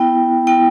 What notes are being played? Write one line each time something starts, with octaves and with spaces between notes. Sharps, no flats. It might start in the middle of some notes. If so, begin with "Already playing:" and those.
Already playing: B3 E4 G5
B3 E4 G5